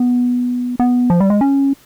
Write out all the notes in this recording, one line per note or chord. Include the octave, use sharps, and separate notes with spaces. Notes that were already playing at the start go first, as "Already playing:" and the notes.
Already playing: B3
B3
F3
G3
G#3
C#4